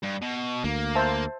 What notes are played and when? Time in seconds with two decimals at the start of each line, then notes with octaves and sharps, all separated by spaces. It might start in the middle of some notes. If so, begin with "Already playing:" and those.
0.03 G2
0.22 B2
0.64 D2 A#3
0.95 C5 E5 A5